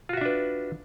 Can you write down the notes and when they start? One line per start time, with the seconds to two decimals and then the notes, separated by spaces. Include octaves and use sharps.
0.09 F4
0.13 F#4
0.17 E5
0.21 D4
0.25 B4